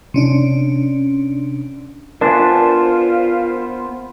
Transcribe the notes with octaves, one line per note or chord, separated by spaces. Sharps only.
C3 C#4 D4
B3 D4 F4 A#4 C5 G#5